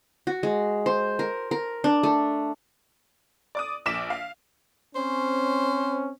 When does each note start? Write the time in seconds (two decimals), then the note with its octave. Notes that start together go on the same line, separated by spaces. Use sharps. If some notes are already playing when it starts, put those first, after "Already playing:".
0.27 F#4
0.43 G#3
0.86 C5
1.19 A#4
1.51 A#4
1.84 D4
2.03 A3
3.55 D5 D6 D#6
3.86 A#1 D6 B6 E7
4.10 F5
4.95 C4 C#4 C5